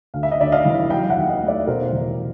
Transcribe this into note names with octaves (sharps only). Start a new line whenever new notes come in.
D2 F5
E5
D#5
D2 D5 E5
D#5 F5
E3
F#3 F5 G5
E5 F#5
D#2
D#5 F5
A3
D5 E5
B2 A#4 C5
E2